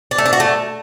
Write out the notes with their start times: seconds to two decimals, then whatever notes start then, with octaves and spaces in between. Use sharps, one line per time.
0.11 D4
0.18 A3
0.26 D4
0.33 F#4
0.40 A3